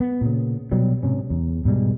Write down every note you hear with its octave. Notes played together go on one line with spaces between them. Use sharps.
B3
A#2 C#3
B2 F#3 G3
G#2 C3 C#4
E2
G#2 B2 G3 G#3